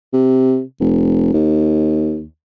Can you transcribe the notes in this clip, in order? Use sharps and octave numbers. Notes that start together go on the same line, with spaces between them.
C3
F1
D#2